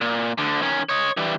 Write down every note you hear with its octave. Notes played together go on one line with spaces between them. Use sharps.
A#2
D2 D3
D#3 C#4
C#5 D#5
E3 G3